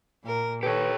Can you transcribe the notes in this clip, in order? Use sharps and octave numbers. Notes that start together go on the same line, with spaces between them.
A#2 A#4
D#3 G4 A4 B4 C#5